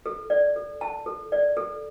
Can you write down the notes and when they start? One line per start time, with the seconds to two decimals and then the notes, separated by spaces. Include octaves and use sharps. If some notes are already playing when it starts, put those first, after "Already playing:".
0.06 A4
0.30 D5
0.56 A4
0.81 A5
1.06 A4
1.32 D5
1.57 A4